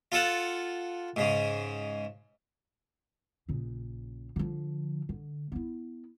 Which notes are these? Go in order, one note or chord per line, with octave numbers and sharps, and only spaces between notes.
F4 A4 F#5
G#2 C#3
A#1 C#3
D3 F3
D3
B3 E4